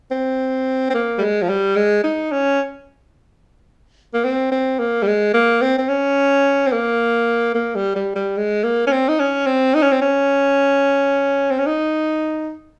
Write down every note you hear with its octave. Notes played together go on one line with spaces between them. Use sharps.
C4
C4
A#3
G3
G#3
F3
G3
G#3
D#4
C#4
A#3
C4
C4
A#3
G3
G#3
A#3
C4
C4
C#4
C4
A#3
A#3
G3
G3
G3
G#3
A#3
C#4
C4
D#4
C#4
C4
D#4
C#4
C4
C#4
C4
C#4
D#4